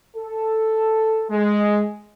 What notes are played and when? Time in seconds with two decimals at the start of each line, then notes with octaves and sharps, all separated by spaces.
0.17 A4
1.30 G#3